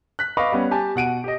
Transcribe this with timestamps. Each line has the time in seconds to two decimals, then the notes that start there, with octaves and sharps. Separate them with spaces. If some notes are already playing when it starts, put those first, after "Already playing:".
0.19 F#6 B6
0.37 B4 D#5 F5 B5 C#6 D6
0.52 G3 B3 C#4
0.71 G4 G#5 A5
0.95 B2 F#5 D7 D#7
1.24 G4 D#5